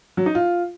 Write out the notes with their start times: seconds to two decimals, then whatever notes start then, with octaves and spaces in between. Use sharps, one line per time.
0.17 F#3
0.26 D#4
0.35 F4